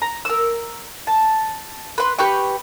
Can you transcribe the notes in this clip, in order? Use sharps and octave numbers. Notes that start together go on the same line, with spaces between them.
A#5
A#4 E6
A5
B4 C6
G4 B4 G5 C#6